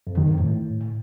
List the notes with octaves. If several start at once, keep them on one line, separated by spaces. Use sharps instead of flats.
F2
D#3
F2
A2